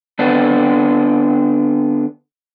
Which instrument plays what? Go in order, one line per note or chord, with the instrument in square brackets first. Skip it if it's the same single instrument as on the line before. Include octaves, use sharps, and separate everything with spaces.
[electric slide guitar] D3 B3 C4 D4